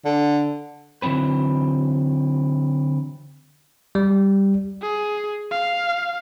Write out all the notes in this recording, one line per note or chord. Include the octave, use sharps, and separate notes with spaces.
D3
D3 E3 F#3 C4 B4
G3
G#4
F5